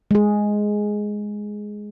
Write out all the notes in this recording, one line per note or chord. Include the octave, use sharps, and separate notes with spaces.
G#3 G#4